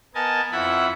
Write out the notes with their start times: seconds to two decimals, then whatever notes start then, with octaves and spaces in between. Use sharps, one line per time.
0.15 B3 A#4 D#5 G#5 A5
0.52 F2 E4 E5 F#5 B5